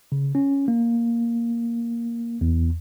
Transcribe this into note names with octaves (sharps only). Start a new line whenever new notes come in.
C#3
C#4
A#3
E2